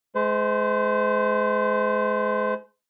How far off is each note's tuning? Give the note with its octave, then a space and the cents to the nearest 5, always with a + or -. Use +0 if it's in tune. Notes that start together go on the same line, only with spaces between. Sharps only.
G#3 +30 C5 -35